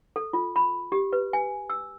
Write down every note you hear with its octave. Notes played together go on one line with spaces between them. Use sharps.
A4
F4
B5
G4
B4
G#5
E6